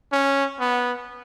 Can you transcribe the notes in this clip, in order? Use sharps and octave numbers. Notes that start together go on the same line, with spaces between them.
C#4
B3